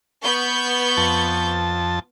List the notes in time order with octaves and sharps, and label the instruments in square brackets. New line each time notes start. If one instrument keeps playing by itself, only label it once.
[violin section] B3 C#6 G6
[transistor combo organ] F2 A5